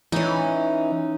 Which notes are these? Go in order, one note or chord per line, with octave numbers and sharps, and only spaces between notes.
E3 C#4 D#4